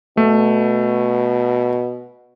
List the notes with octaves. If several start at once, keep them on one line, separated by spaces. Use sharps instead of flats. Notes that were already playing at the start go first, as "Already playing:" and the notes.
B2 A3